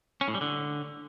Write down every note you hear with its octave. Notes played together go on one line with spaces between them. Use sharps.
C#4
A2
G3
D3